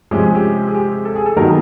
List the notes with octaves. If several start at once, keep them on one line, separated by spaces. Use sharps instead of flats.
C3 F3 G#3 C#4 G4
G#4
G4
G#4
G4
A4
G#4
A4
D#3 F#3 B3 A#4